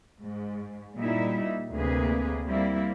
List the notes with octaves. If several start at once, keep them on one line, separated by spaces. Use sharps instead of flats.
G#2
A#2 G3 D#4 E4 E5
D2 C3 A#3 G#4 B4
G3 A#3 C4 E4